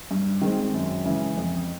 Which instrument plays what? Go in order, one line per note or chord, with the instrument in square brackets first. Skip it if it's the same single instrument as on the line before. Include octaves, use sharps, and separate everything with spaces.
[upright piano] G2
D#3 G#3 C4
F#2
C#3 E3 G#3
F2